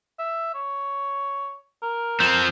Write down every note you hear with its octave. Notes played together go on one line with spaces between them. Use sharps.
E5
C#5
A#4
F3 C4